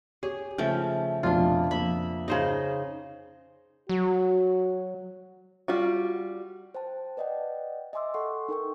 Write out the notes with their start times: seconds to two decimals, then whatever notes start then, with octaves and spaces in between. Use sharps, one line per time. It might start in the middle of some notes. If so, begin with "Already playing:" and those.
0.23 G4 G#4 C#5
0.58 C#3 F3 A3 E5 G5
1.23 F1 F2 B2 D4 F4
1.71 F2 A#3 E5 B5
2.28 C#3 D#4 C5 D#5
3.89 F#3 F#4
5.68 G3 F4 F#4
6.75 C5 G5 A5
7.17 B4 D5 D#5 F#5 G5
7.93 D#5 E5 G#5 C6 D6 E6
8.14 A4 F#5 C6 C#6
8.49 D#4 A4 A#4 G5 C#6